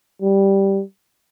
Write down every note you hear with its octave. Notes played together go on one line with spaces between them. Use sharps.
G3